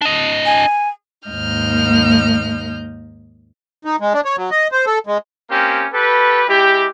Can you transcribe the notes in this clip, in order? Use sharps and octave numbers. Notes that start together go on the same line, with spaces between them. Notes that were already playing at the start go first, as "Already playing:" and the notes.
D4 D#5
G#5
D#2 G#2 A#3 D#5 F6 G6
D#4
G#3
D4
C#5
F#3
D#5
C5
A4
G#3
A#3 C4 C#4 G4
G4 A4 B4
G#3 E4 G4